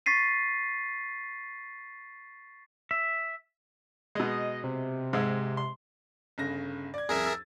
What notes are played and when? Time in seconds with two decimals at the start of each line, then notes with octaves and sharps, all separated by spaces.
0.06 C#6 A6 B6 C7 D#7
2.91 E5
4.15 B2 G#3 D#5
4.64 C3
5.13 G#2 G#3 E5
5.57 C6
6.38 G1 C#3 A#6
6.94 D5 G#6
7.09 C2 F2 G#4 A#4 E5
7.26 E6 A6